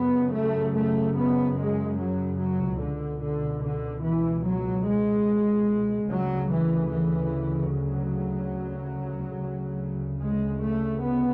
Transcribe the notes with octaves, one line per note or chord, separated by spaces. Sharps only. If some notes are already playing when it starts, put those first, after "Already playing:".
Already playing: F#2 C#3 B3
A3
A3
B3
G#3
F#3
F#3
C#2 B2 D3
D3
D3
E3
F#3
G#3
D2 C#3 F#3
E3
E3
F#3
D2 C#3
G#3
A3
B3